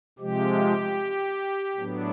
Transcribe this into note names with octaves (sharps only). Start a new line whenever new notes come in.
C3 F3 G#3 G4
A2 F#3 B3 D4